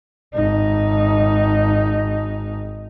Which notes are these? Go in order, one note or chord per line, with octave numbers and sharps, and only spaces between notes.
G#1 D#4